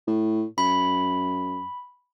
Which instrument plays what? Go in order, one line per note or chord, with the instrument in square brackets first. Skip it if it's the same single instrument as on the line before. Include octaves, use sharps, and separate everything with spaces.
[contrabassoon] A2
[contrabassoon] F#2 [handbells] B5